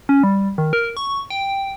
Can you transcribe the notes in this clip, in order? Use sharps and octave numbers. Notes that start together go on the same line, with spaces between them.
C#4
G3
D#3
A#4
C#6
G5